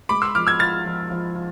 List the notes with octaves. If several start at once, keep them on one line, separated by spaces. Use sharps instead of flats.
G#3 B5 D6
C6 E6
F3 D6 F6
E6 G#6
F4 F6 A6
F3
F3
F4